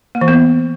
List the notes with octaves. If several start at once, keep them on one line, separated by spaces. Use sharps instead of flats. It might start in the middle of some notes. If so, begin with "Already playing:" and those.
A#3
E3
B3